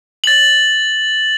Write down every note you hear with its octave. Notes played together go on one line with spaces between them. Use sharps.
A6 F#7